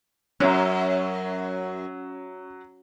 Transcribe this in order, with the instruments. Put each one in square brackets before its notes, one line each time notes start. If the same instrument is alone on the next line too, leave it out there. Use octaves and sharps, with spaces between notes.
[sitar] F#2 [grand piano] F#3 [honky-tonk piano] C#4 C#5 E5